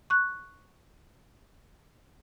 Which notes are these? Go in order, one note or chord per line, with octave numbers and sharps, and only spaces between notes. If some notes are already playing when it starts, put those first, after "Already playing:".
C#6 F#6